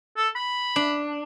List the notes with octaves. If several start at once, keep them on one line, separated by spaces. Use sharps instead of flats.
A4
B5
D4